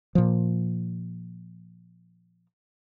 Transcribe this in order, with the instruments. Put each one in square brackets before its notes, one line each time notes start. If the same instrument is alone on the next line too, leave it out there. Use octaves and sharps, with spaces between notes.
[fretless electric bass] A#2 F3